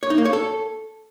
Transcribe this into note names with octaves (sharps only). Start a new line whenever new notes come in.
C#5
D#4
A#3
C#5
A4